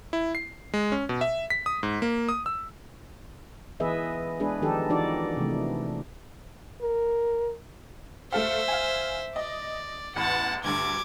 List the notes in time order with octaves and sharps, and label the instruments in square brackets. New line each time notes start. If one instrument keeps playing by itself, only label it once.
[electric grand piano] E4
C7
G#3
C#4
B2
E5
B6
D#6
G#2
A#3
D#6
E6
[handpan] E3 B3 G#4 B4 D#5 E5
G#3 B3 D4 G#4 B4
D#3 F3 D4 D#4 G4 A4
E3 D4 D#4 F#4 D5
C3 E3 A3
[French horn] A#4
[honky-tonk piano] A3 A4 F5 [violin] C5 E5
[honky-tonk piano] F5 G#5
[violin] D5 [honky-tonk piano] D#5
[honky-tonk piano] A1 E2 B5 [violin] F#5 A5
[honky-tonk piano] D2 G2 D3 [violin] D6 G#6